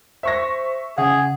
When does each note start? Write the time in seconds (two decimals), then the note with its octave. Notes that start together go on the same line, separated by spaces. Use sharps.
0.23 C5 E5 C#6 A#6
0.98 C#3 G#4 F#5